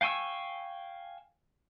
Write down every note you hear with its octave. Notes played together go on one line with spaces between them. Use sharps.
F5 G5 G#5 C#6 E6